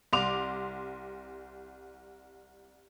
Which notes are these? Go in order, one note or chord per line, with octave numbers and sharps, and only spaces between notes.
C2 C6 D6 F7